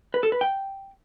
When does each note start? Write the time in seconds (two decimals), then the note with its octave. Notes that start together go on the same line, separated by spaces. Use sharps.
0.14 B4
0.23 A4
0.32 B4
0.41 G5